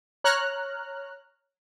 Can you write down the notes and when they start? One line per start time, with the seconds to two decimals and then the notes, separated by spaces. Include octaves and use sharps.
0.24 C#5 A#5 F6 F#6